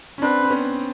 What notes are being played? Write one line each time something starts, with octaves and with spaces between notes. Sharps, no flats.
C#4
C4 D4 B4
C4
B3 C#4